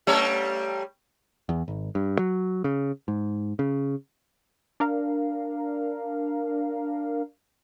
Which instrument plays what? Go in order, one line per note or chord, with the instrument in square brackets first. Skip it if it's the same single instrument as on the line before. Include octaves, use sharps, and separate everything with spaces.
[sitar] G3 A3 C#5
[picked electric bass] E2
G#1
G2
F#3
C#3
G#2
C#3
[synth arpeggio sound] D4 A#4 F5